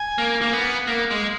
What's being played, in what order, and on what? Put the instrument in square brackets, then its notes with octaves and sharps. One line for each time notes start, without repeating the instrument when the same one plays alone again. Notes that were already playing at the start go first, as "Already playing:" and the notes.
Already playing: [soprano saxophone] G#5
[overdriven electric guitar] A#3
A#3
B3
A#3
G#3